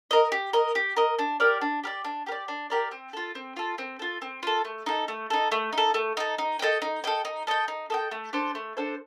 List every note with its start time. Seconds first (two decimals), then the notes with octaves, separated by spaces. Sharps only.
0.11 A#4 D#5
0.32 G4
0.53 A#4 D#5
0.75 G4
0.97 A#4 D#5
1.19 D4
1.40 G4 A#4 D5
1.61 D4
1.84 G4 A#4 D5
2.05 D4
2.26 G4 A#4
2.32 D5
2.48 D4
2.70 G4 A#4 D5
2.91 C4
3.13 F4 A4
3.35 C4
3.57 F4 A4
3.78 C4
3.99 F4 A4
4.22 C4
4.43 F4 A4
4.65 A3
4.86 D#4 A4
5.08 A3
5.30 D#4 A4
5.52 A3
5.73 D#4
5.78 A4
5.94 A3
6.17 D#4 A4
6.38 D#4
6.59 A4 D#5 G5
6.82 D#4
7.04 A4 D#5 G5
7.25 D#4
7.47 A4 D#5 G5
7.68 D#4
7.90 A4 D#5 G5
8.11 A3
8.33 D4 A4 C5
8.55 A3
8.77 D4 A4 C5